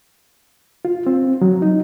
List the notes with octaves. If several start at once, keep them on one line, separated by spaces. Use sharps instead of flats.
F4
C4
F#3
D#4